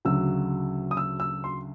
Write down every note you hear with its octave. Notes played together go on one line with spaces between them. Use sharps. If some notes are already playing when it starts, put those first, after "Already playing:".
D2 C#3 F#3 E6
D#6
E6
E6
C6